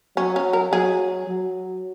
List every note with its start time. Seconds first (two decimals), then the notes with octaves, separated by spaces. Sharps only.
0.17 F#3 C#4
0.36 C#4
0.53 A#4
0.72 F#3 G#4
1.28 F#3